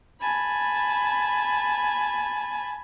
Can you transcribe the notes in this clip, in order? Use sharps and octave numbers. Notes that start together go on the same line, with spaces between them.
G#5 A5 B5